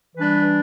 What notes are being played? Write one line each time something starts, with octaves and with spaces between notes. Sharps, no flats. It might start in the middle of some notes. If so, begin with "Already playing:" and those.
E3 G3 D4 B4